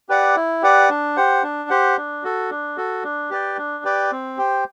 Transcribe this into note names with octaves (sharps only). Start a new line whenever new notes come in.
G4 B4 D5 F#5
E4
G4 B4 D5 F#5
D4
G4 C5 F#5
D4
G4 C5 F#5
D4
F#4 A4
D4
F#4 A4
D4
G4 B4 D5 G5
D4
G4 B4 D5 G5
C4
G4 C5 G5